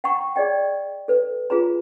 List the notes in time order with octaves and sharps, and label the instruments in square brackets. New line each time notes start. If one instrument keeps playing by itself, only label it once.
[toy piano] F#5 G5 A#5 C#6
G#4 D5 D#5 G5
A4 B4
F4 G#4 B4 A#5